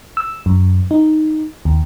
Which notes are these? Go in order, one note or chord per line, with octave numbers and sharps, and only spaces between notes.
E6
F#2
D#4
D#2